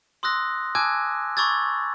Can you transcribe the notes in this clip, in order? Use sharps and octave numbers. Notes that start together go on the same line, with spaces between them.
C6 D#6 E6 F#6 A#6
G#5 A5 D6 E6 F#6 G#6
B5 C#6 D6 E6 G#6 A6